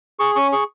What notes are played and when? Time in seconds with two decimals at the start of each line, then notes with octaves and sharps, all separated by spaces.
0.19 G#4 C#6
0.36 C#4 C#6
0.52 G#4 C#6